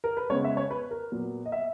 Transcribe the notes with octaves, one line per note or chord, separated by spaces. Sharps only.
A#4
B4
C#3 G#3 B3 C#5
E5
C#5
B4
A#4
A#2 F#3 B3
D#5
E5